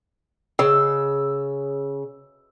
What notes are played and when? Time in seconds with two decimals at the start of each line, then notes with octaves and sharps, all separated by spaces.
0.59 C#3 E6